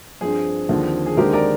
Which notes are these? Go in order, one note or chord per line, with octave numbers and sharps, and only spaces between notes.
G2 F3 C4 G#4 C5
D#2 D3 F3 C4
G#4
D#2 D3 G#3 C4 G4 A#4
A#4 D5